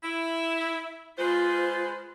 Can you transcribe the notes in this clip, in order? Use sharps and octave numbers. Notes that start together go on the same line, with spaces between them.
E4
G#3 F4 B4 C5